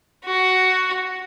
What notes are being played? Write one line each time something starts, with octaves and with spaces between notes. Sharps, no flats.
F#4